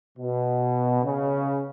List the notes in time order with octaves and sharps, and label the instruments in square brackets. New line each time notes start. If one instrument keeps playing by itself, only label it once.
[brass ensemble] B2
C#3